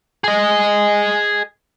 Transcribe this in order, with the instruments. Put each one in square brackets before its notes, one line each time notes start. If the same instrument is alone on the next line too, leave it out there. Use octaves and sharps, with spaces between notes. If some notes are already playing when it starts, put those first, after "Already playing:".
[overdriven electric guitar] G#4 D#5